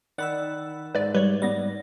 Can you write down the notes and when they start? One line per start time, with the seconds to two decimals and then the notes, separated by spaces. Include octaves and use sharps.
0.18 D#3 D5 F#5 B5 E6 A6
0.95 G#2 B4 D5
1.15 G3 B4 C#5
1.42 G3 B3 D5 A#6